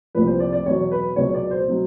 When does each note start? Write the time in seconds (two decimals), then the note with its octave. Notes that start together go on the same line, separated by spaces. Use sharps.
0.15 C2 A#2 F3 B4
0.27 C5
0.40 D5
0.53 D5
0.66 E2 B2 F#3 C#5
0.91 B4
1.16 C#2 B2 F#3 C#5
1.34 D5
1.51 C5
1.68 B2 F#3